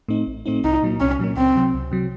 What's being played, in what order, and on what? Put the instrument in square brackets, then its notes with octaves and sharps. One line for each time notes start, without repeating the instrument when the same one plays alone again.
[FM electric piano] A2 A3 C4 D#4
A1
A2 A3 C4 D#4
[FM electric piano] C2 [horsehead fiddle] D#4
[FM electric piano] A#2 F#3 A#3
[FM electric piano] C2 [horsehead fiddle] C#4
[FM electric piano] A#2 F#3 A#3
[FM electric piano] C#2 [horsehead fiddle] C4
[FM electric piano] C3 F#3
C#2
C3 F#3